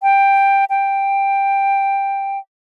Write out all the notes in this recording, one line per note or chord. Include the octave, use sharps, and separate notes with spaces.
G5
G5